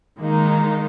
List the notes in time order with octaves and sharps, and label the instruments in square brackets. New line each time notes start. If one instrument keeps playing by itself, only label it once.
[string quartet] D#3 G#3 A#3 D#4